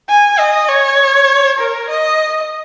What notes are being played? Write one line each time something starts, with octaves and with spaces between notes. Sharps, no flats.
G#5
D#5
C#5
A#4
D#5